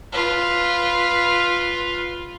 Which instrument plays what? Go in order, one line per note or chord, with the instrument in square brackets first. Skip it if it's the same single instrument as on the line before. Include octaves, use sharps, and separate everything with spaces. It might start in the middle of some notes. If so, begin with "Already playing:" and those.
[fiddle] F4 B4